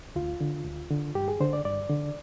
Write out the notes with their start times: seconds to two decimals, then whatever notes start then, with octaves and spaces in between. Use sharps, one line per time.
0.16 D2 F4
0.41 D3
0.65 D2
0.91 D3
1.15 G2 G4
1.28 G#4
1.40 D3 C5
1.53 D5
1.65 G2 D5
1.90 D3